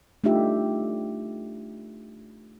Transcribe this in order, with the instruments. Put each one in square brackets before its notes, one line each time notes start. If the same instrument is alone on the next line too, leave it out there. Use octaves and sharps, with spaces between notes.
[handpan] A3 D4 D#4 F4 G4 E5